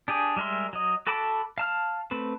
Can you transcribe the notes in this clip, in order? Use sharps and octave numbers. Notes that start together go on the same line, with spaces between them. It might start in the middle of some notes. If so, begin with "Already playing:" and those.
D4 G4 G#4
G3 G#3 A#4 E5 C6
F#3 D#5
F#4 A4 A5 B5 D6
F5 A5 F6
A3 C4 B4